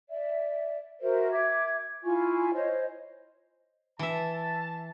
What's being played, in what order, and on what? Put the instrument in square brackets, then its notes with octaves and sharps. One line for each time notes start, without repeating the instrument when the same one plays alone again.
[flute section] D5 E5
F#4 A#4 C5 E5
E5 D6 G#6
E4 F4 G#5 C#6
C5 C#5 D#5
[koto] E3 E5 [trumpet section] A5